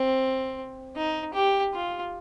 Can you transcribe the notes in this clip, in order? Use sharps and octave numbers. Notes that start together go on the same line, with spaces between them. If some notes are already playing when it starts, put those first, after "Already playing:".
Already playing: C4
D#4
G4
F4